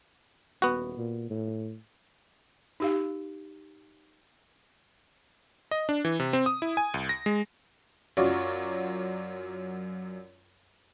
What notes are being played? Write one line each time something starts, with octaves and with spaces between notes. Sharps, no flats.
D#1 B3 F#4
A#2
A2
D#4 G4 F5
D#5
D4
E3
C3
C4
D#6
E4
G#5
C2
A#6
G#3
F#2 F#3 F4 D5 C#6